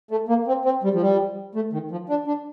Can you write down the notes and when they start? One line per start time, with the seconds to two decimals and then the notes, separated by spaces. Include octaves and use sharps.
0.11 A3
0.29 A#3
0.47 C4
0.65 C4
0.84 G3
0.94 F3
1.01 G3
1.55 A3
1.73 D#3
1.91 F3
2.09 D4
2.27 D4